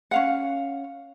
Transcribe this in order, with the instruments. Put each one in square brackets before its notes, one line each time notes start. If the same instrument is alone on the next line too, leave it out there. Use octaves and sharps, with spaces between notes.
[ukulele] C#4 F5 F#5